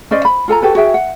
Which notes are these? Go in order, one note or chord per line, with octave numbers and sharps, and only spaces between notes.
C#4 C5 D5 D#5
B5
F4 A4 G#5 A#5
F#4 G4 A4 B4
F#4 G#4 E5 G5
F#5